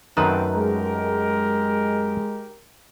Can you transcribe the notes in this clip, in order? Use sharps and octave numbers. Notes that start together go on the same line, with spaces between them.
F#2 D#3 A3 C4 D#4 B4
G#3 G4 A#4